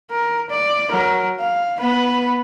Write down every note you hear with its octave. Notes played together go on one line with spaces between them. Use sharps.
A#4
D5
F#3 A#4
F5
B3 B4